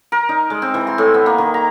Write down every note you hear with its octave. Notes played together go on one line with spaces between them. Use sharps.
A#4
D#4
G#3
C4
E3
C6
A2
B3
A#3
D#3
A#5